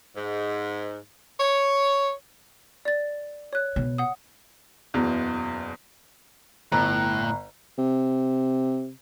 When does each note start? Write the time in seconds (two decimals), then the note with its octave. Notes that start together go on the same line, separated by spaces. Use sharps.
0.15 G#2
1.40 C#5
2.85 D5 A6
3.53 C#5 F#6
3.76 B2
3.98 F#5 D#6
4.94 F#1 E2 B2
6.72 G1 A2 A#5 F#6
7.78 C3